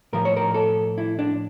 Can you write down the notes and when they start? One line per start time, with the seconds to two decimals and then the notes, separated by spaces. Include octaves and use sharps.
0.13 A2 F3 A#4
0.25 C#5
0.36 A#4
0.54 A4
0.98 E4
1.19 D4